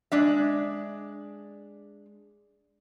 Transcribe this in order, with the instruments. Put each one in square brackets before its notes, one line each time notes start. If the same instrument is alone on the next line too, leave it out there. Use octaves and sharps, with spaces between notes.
[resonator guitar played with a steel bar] G#3 D4 E5